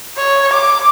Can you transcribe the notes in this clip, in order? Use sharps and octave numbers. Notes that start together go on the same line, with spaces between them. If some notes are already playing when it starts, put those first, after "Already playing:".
C#5
D6